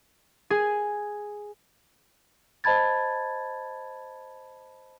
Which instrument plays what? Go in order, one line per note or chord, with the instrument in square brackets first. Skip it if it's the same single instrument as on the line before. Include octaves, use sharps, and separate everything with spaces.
[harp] G#4 G#5
[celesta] C5 D#5 A5 B5 G#6 A6